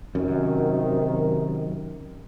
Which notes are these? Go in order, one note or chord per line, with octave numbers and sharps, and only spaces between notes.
F#2 C3 D#3